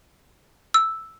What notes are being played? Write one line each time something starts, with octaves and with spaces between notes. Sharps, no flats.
E6